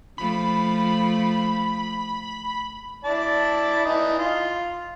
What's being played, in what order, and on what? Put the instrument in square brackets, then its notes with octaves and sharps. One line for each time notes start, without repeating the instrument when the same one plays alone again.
[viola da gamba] F3 A3 [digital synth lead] B5
[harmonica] E4 D5 A5
E3 D#4 D#6
F4